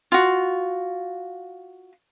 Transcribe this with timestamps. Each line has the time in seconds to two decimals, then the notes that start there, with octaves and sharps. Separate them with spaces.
0.12 F4 F#4